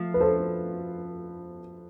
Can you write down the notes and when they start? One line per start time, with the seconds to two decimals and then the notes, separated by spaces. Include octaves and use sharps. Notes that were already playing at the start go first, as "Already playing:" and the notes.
Already playing: F3 A3
0.14 B4
0.20 A4 C5